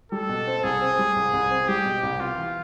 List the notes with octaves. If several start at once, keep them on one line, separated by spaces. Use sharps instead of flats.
G3 A4
B2
C4
C2 G#4
C4
G3
C2
C2
C4
G3 G4
B2
C2
B3 F4
E3